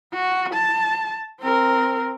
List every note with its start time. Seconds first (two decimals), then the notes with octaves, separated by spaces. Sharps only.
0.14 F#4
0.54 A5
1.41 C4 A#4